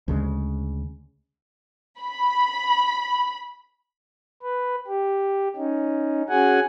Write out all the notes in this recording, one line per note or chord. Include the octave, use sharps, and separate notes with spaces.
D2 C#3 G3 G#3
B5
B4
G4
C#4 D#4
C#4 F#4 G#4 F#5 G#5